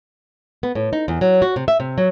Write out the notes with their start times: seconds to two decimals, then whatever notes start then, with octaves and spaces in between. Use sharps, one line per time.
0.63 B3
0.75 A2
0.93 D#4
1.08 E2
1.21 F#3
1.42 F#4
1.56 C3
1.68 E5
1.80 C3
1.98 F#3